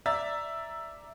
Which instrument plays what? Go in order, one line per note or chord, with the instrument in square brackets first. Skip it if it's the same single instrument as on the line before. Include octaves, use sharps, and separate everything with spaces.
[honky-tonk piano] D5 E5 A#5 E6 A6